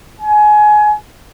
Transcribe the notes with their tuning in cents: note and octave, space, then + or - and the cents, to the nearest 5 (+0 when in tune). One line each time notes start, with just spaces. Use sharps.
G#5 +25